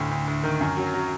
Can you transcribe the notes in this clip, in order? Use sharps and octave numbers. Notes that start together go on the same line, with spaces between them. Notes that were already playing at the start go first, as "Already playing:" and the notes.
Already playing: D2 A2
D2
D2
D#3
F#2
F#3
F#3